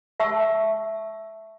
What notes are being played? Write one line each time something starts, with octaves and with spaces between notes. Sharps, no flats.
E5 A5 C#6 E6